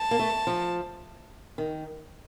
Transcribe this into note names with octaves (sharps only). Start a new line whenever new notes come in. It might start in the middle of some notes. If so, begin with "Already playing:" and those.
Already playing: A5
A#3
A3
F3
D#3